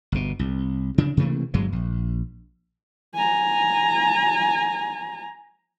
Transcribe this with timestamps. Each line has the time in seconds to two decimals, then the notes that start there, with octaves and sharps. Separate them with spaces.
0.12 G1 B2
0.39 C2
0.98 C#3 D4
1.17 C3 E3 A3 A#3
1.54 G1 G2 F#3 G#3
1.73 A#1
3.14 G#5 A#5